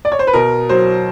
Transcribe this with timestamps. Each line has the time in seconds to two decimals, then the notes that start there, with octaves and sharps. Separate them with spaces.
0.05 D5
0.12 C#5
0.19 C5
0.27 B4
0.33 B2 A#4
0.69 F#3 C5